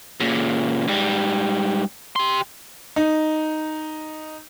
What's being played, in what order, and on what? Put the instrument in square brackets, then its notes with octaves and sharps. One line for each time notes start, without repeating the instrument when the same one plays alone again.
[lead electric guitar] A#2 C#3
G#2 G3
G4 C6
[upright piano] D#4